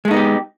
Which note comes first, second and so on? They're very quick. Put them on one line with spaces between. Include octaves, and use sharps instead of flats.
G#3 A3 D#4 B3 G4